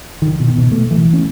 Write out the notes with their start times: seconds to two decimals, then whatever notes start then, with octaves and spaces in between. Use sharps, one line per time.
0.22 D#3
0.40 B2
0.58 B2
0.71 A3
0.91 E3
1.14 C#4